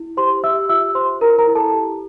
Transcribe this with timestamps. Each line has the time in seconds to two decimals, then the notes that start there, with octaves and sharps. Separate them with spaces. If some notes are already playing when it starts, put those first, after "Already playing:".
Already playing: E4
0.17 G4 C5 C6
0.43 G4 E5 E6
0.69 F4 E5 E6
0.95 C5 C6
1.21 E4 A#4 A#5
1.39 A#4 A#5
1.47 E4
1.55 A4 A5
1.73 G4